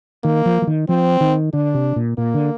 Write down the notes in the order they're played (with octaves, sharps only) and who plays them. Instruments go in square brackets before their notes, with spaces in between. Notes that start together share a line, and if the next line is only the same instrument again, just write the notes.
[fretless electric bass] D#3 [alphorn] A#3
[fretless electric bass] F3
F3
D#3
[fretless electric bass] F3 [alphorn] C4
[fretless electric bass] D#3
[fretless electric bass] D3 [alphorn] D4
[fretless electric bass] C3
A#2
[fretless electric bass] A#2 [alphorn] A#3
[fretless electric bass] D3